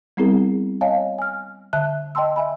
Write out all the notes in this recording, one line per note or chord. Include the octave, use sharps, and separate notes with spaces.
G3 B3 C4 E4 G#4 A#4
C#5 D#5 F5 G#5 A5
G#5 F6
D3 E5 A5 F#6
D#5 G5 A5 C6 E6
E5 G#5 B5